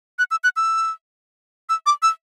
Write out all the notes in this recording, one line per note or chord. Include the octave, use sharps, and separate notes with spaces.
F#6
E6
F#6
E6
E6
D6
E6